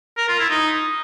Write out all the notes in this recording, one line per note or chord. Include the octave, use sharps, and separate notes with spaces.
A#4
F4
E4
D#4